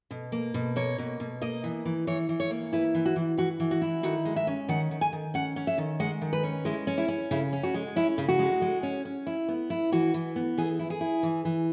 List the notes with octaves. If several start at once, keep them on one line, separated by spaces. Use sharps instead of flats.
B2
A#3
B2
A#3 C#5
B2
B2
A#3 D#5
E3
E3
E3 C#5
E3
C#5
A#3
E4 B4
E3
F#4
E3
E3 F#4
E3
F#4
E4
D#3 F#4
G#3
E5
C#4
D#3 F#5
D#3
G#5
D#3
C#4 F#5
C#4
E5
D#3
G#3 F#5
D#3
B4
C#4
G#3 E4
C#4
E4
C#4
C#3 E4
C#4
F#4
G#3
C#4 E4
C#3
F#4
G#3
G#3
C#4
C#4
E4
B3
E4
E3 F#4
E3
B3
E3 G#4
E4
G#4
E4
E3
E3